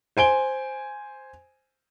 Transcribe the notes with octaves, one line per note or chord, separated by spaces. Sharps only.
C5 G#5 D7 G7